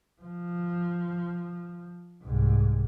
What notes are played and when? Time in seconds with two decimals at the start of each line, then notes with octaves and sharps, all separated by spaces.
0.22 F3
2.23 C2 G#2